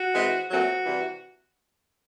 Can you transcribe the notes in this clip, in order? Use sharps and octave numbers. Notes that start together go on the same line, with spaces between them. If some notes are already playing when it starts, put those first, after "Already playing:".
Already playing: F#4
E3 G#3 C4
A#2 F#3 A3 C4 F#4
C3 E3 G3